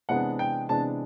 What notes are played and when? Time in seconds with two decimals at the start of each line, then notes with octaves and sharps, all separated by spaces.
0.09 C3 E3 G#3 B3 D4 F#5
0.39 G5
0.69 C3 E3 G#3 B3 D4 A5